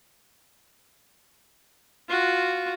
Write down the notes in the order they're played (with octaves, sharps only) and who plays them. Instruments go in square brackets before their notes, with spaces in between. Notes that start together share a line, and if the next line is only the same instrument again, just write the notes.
[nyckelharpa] F4 F#4